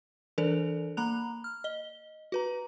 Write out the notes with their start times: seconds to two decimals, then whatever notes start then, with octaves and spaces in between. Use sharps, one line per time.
0.38 E3 D4 A4 A#4 D5 F7
0.97 A#3 A#5 B5 F#6 F7
1.44 F6
1.64 D#5 G7
2.32 F#4 B4 A#5